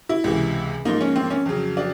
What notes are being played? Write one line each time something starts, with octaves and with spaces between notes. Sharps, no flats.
E4
C#2 C3 E3
G#2 F3 A#3 D#4
C#4
C4
C#4
F2 C#3 F#3
D4